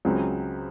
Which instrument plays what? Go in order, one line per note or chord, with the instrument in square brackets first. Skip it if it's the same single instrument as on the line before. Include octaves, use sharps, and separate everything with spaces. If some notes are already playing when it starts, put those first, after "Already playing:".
[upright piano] C#2 C#3 F#3 C4